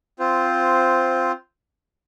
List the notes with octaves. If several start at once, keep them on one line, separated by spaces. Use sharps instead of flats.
C4 F4 C5